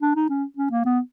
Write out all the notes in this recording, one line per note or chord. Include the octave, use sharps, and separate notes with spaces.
D4
D#4
C#4
C#4
A#3
B3